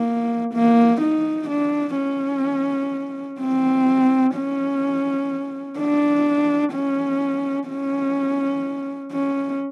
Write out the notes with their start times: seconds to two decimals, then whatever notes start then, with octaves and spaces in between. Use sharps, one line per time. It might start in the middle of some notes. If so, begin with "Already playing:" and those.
Already playing: A#3
0.54 A#3
1.01 D#4
1.49 D4
1.97 C#4
3.40 C4
4.36 C#4
5.79 D4
6.73 C#4
7.69 C#4
9.12 C#4